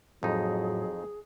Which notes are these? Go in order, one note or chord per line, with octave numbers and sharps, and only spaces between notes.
F2 A2 F#3 D#4 G#4